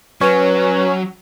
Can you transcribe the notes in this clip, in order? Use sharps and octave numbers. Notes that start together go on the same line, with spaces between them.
F#3 C#4 B4